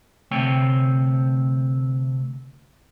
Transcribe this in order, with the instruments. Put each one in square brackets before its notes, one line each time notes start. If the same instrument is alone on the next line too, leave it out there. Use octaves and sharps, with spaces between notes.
[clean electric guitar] D2 C3 A3 C4 C#5 G5